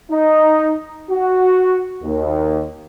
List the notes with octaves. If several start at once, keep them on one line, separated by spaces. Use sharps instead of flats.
D#4
F#4
D#2